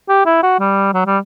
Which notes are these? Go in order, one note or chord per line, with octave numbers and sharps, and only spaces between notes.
G4
E4
F#4
G3
F#3
G3